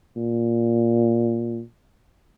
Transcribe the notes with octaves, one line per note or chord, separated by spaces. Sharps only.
A#2